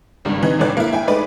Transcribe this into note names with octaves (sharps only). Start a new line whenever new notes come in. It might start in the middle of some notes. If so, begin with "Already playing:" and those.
G#1 C#2 G2
C3 E3 D#4
C#2 A2 E3 D5 F#6
A#3 E4
E4 G5 G#5
G#3 A3 D#4 B4 D5